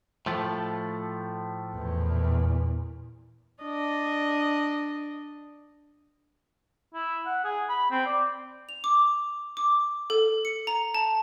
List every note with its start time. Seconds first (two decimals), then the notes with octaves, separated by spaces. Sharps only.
0.26 A2 F3 A3
1.75 E2 A#2
3.63 D4 D#5
6.94 E4
7.26 F#5
7.44 G#4
7.69 B5
7.91 C4
8.06 D5
8.69 F7
8.84 D6
9.57 D6
10.10 A4
10.45 C#7
10.67 A#5
10.95 A5